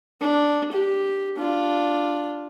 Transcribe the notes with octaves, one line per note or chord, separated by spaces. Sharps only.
D4
G4
D4 F4